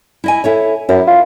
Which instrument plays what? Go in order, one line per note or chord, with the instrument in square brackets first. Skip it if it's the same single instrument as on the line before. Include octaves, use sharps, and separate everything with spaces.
[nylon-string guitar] E4 D#5 G#5
E4 A4 C#5
[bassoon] F#2 [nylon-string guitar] E4
[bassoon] F4